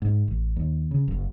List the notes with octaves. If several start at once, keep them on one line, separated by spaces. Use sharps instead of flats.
G#2
A1
D#2
C#3
F#1